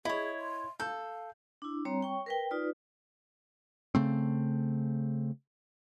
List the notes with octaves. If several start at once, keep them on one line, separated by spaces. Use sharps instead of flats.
E4 G#4 C#5 D#5
C6
A4 F5 G6
D4 E4
G3 C4 C#5 A#5
C#5 G5 C#6
A#4 B4 G5
D#4 F4 B4 D5
C#3 A3 C4